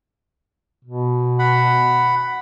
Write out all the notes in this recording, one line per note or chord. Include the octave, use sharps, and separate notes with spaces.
B2
F#5 B5